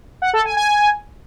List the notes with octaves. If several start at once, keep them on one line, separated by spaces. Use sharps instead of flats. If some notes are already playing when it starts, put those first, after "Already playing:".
F#5
A4
G#5
G#5